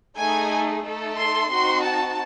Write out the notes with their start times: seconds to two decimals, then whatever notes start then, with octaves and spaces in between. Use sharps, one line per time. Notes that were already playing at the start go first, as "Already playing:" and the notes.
0.17 A3 D#4 G#4 G#5
0.83 A3 D#4 A4
1.17 C6
1.51 C4 D#4 F#4 C6
1.83 A5